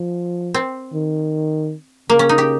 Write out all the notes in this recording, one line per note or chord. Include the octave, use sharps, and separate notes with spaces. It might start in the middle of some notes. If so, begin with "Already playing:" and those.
Already playing: F3
C4
D#3
C#3 A#3
C#4
D#4
G4